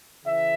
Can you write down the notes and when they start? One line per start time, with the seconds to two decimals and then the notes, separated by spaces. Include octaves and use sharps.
0.24 C#3 E3 E5